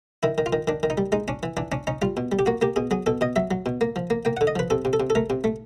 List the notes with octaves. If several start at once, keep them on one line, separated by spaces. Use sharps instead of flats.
D#3 E4
D#3
F4
D#3
D#3 D4
D#3
D#4
G3
G#3 D#4
C#4 D4
E3
E3 D4
C#4 D4
C#4 D#4
G3 F4
B2
G3
G4
A#3 F#4
A#3 G4
B2 G#4
F#3 G#4
B2 A4
B2 D#5
F#3 E5
F#3
B2
A#3
F3
A#3
A#3 G5
F#5
D3
D#5
F3 B4
C3 A4
C3
A4
C3
A4
A3 A#4
C3
A3